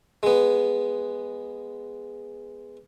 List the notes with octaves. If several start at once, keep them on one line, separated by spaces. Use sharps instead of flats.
G#3 B3